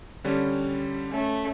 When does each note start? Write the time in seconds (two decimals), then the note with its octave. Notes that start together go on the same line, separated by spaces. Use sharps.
0.24 D3 G3 C#4
1.11 A3 C#4